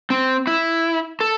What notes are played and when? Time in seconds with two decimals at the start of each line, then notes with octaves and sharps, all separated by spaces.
0.10 C4
0.47 E4
1.20 A4